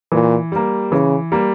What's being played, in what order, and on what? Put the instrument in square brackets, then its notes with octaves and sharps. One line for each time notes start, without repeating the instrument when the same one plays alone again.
[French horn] A#2 [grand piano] E3
[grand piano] G3 A#3
[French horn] C#3 [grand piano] E3
[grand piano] G3 A#3